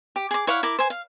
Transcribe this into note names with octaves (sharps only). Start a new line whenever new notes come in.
G4
G#4 D6
E4 C#5 F5 F#5
E4 A#4 D6
C5 G#5
F5